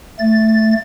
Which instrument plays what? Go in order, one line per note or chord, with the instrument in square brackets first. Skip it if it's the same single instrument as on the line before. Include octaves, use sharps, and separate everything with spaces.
[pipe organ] A3 A6